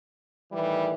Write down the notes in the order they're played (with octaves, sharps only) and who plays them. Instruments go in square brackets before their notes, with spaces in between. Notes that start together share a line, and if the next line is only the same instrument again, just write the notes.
[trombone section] A2 D#3 E3 [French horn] G3